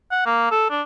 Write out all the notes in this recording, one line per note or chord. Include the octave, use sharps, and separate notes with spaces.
F#5
A#3
A4
D4